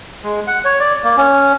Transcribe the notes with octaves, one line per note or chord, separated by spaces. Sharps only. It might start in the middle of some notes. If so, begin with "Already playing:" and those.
G#3
F#5
C#5
D5
A#3
C#4